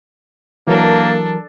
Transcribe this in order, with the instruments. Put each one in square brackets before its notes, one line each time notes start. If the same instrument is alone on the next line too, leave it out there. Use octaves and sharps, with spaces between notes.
[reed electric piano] E3 F#3 A#4 [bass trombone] A#3 [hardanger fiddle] D4 A4